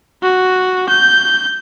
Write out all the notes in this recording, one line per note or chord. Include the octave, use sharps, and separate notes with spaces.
F#4
G6